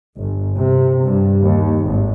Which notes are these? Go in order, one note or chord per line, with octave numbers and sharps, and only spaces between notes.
G1
C3
G2
D#2
G#1